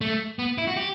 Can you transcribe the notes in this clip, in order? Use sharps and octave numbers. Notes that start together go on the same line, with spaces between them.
A3
B3
E4
F#4
G4